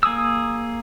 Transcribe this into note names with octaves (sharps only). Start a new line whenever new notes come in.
A#3 G#4 D#6 E6